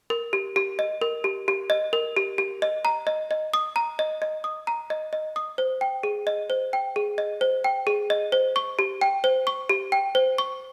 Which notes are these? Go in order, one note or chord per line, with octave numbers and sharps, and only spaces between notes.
A#4
G4
G4
D#5
A#4
G4
G4
D#5
A#4
G4
G4
D#5
A#5
D#5
D#5
D#6
A#5
D#5
D#5
D#6
A#5
D#5
D#5
D#6
C5
G5
G#4
D#5
C5
G5
G#4
D#5
C5
G5
G#4
D#5
C5
C#6
G4
G5
C5
C#6
G4
G5
C5
C#6